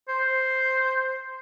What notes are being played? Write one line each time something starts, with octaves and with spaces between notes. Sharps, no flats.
C5